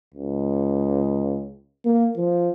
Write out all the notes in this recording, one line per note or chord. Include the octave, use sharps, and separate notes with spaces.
C#2
A#3
F3